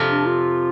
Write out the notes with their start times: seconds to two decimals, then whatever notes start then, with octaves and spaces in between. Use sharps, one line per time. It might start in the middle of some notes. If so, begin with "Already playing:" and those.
Already playing: F2 C3 F3
0.09 D4
0.26 F4